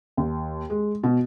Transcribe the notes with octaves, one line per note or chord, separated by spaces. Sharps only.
D#2
G#3
B2